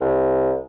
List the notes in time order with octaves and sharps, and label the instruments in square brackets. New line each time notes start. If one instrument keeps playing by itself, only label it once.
[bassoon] C2